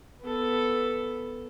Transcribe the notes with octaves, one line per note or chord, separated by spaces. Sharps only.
B3 A4